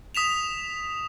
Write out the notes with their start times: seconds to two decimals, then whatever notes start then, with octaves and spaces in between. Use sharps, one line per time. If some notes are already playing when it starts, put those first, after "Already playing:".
0.15 D#6 B6 E7 F7